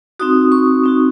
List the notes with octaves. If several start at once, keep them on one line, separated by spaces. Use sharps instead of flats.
C4 D#4 F#4 D#6
C#6
C4 D#4 F#4